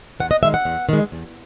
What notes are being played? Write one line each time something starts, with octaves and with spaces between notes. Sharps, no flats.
E2 F#5
D#5
D#3 G#3 E5
F#5
E2
D#3 G#3
E2